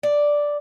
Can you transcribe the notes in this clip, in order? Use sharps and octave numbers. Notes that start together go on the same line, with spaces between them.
D5